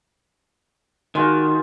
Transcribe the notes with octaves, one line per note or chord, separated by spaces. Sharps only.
D#3 G#3 F4 F#4